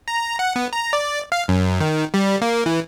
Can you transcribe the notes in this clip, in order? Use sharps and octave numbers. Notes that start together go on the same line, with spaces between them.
A#5
F#5
B3
A#5
D5
F5
F#2
D#3
G3
A#3
E3